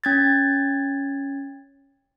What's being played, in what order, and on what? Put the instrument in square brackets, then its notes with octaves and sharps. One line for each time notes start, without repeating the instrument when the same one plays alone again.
[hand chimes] C#4 G#6 A6